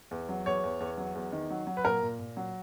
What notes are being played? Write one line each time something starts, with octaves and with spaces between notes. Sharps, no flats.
E2
F#3
E2 C#5
E2
E2
F#3
E2
D#3
F#3
F#3
B4
A#2 A#4
A#2
A#2
F#3